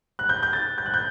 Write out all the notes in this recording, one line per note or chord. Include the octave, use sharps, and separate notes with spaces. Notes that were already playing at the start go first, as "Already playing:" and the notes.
F#6
G6
G6
A6
G6
F#6
G6